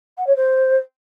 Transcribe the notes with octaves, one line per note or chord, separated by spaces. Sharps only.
F#5
C#5
C5